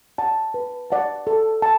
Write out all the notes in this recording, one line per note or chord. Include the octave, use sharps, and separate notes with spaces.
D5 F#5 A5
B4
D5 F#5 A5
A4
A5